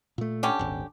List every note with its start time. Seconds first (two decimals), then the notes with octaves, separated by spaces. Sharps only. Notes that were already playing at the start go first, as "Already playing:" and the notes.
0.18 A#2 A3
0.43 D3 C#4 G4
0.59 D#1 G#1